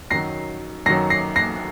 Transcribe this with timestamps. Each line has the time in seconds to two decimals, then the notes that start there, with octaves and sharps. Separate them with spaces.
0.11 F#2 D#3 F#3 A#6 C7
0.86 F#2 D#3 F#3 A#6 C7
1.10 A#6 C7
1.36 A#6 C7